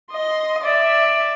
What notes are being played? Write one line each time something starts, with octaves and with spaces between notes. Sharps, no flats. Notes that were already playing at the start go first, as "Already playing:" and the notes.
D#5 C6
D5 E5